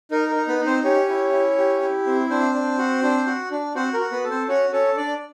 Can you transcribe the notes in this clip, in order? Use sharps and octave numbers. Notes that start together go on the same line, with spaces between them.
D#4 A#4
A#4
D#4
B3 B4
D#4
C4 C5
C#4 G4 C#5
E4
E4
G4
E4
C4
C4 D4 C5
D4
F#4
D4
F#4
D4
C4 F#4 C5
A#4
F#4
B3 B4
A4
C4 C5
C#4 F#4 C#5
C#4 A4 C#5
D4 D5